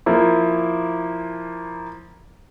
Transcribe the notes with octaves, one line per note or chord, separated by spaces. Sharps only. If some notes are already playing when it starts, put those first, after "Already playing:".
F3 A#3 E4